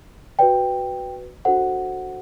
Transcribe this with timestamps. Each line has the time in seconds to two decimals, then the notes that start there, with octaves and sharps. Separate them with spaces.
0.39 F#4 B4 D5 G5
1.45 D4 F#4 A4 C5 F#5